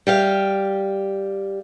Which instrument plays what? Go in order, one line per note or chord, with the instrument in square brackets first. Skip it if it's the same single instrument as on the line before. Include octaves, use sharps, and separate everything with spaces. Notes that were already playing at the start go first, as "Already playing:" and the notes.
[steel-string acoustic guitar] G3 G4 F5